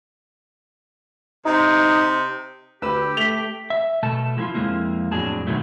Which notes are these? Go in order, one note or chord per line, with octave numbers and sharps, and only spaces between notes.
C3 D#4
D2 G4 B4 E6
A3 B6 F7 G7
E5
B2 A3 A4 A5
F3 G#3 B3 E4 F4
F2 A#2 F3 G#3 A#3 E4
F2 A2 F#3 D4 G#4 A5
G#2 B2 D#3 F#3 A3